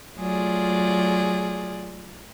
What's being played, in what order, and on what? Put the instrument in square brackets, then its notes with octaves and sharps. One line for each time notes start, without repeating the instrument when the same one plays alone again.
[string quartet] F#3 A3 F4 G#4 D5